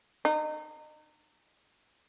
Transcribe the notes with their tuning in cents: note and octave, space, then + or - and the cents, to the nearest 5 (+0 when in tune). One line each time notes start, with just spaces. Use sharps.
D#4 -25